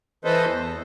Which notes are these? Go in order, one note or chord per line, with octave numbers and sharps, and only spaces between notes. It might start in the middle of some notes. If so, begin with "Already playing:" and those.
E3 A4 B4 C5 D#5
E2